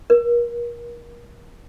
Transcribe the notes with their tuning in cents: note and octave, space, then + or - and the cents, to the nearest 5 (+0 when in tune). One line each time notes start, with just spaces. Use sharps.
A#4 +30